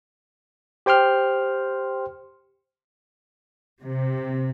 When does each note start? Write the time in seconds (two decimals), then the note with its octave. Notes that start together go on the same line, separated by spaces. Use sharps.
0.86 G4 C5 G5 C6 F6
3.82 C3